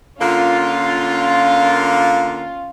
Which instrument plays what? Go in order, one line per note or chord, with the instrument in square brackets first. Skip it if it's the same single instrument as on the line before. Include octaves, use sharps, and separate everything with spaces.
[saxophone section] D3 A#3 [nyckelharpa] C#4 F5 [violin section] F4